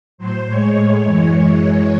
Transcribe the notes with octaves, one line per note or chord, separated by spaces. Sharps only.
A2 F#3 C5
A2 G#3 C#5
A2 G#3
F#2 E3 G#3 C#5